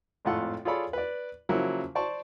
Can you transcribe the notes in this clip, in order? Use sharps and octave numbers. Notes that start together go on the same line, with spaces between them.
G#1 F2 A2 F4 A4 F#5
F4 G#4 A4 C#5 D5 B5
B4 D5
C#3 F3 F#3 A#3 E4
C5 D5 A5 C#6